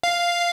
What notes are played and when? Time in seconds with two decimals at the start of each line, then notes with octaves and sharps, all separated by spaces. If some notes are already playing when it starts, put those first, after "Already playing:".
0.03 F5